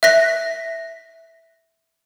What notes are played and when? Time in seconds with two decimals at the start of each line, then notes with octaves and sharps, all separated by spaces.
0.03 E5 F#6 A#6 B6